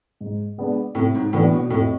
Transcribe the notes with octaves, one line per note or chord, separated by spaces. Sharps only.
G#2
G#3 B3 D4
A2 C3
G#2
A2 E3 B3 D4
B2
F2 A2